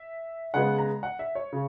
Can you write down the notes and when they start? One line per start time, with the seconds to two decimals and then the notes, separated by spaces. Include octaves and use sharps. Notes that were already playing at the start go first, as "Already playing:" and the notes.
Already playing: E5
0.54 C#3 G#3 B3 F#5
0.78 A#5
1.03 F#5
1.19 E5
1.35 C#5
1.53 C#3